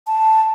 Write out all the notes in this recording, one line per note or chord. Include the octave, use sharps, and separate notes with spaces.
A5